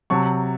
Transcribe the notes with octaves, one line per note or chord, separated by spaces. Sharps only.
C3 F#3 A5 C#6